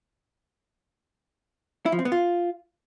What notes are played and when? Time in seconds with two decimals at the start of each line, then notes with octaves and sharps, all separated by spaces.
1.86 E4
1.92 F3
1.99 C4
2.05 B3
2.12 F4